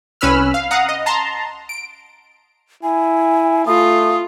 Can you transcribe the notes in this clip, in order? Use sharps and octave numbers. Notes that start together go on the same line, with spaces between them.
C2 C#4 B4 B5 E6 F6
F5
F5 F#5 A#5 D#6
D#5
A5 A#5 C6
D7
E4 G#5
A3 F4 D#6